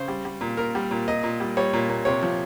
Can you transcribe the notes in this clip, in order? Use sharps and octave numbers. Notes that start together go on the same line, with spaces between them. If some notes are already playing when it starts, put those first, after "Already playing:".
Already playing: C#3 C5
G3
G3
A#2
A#2 A#4
G3
A#2
A#2 D#5
A#2
G3
G3 C#5
A#2
A#2
C3 C#5
F3